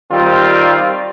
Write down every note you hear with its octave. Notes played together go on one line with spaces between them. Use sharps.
D#3 G3 C4 F4